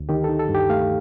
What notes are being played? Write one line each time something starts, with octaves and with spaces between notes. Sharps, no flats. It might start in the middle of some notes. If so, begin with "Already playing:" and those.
Already playing: D2
D#3 G4
D#4 A4
A4
G2
G4
A3 F5